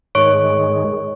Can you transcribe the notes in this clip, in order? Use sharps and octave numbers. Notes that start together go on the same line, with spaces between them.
G#2 D#3 G#3 C#5 C#6